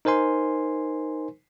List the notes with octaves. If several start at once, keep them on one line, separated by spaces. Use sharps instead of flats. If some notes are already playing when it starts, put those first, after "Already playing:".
D#4 A#4 C5 G#5 C6